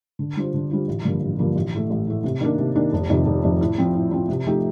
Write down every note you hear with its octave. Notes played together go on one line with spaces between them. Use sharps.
D3
G3 D4 F4 C5
D3
G3 D4 F4 C5
A1
G2 D3 F3 A#3
A1
G2 D3 F3 A#3
A1
A2 A3
A1
A2 A3
C3
D#3 A#3 D4
C3
D#3 A#3 D4
F1
F2 C3 D#3
F1
F2 C3 D#3
A2
F3 C4
A2
F3 C4
C3
F3 A3 D#4 G4